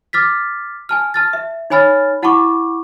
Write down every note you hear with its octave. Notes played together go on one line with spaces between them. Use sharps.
D6 F6 A6 B6
G#5 A5 F6
A5 F6 A6
E5
D#4 C#5 G#5 B5 F6 A6
E4 F#5 A5 B5 C#6 D6